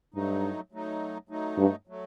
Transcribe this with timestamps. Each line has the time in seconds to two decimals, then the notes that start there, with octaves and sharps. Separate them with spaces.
0.14 G2 F#3 A3 D#4
0.72 F#3 A3 D#4
1.29 F#3 A3 D#4
1.58 G2
1.87 F#3 A3